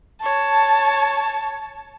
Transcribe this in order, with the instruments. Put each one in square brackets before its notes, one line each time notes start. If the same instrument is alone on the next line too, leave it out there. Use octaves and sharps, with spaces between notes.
[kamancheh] C#5 [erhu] A5